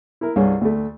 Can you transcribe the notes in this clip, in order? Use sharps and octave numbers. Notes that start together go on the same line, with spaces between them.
E4 A#4
C2 G2 G#4 C#5
D2 A3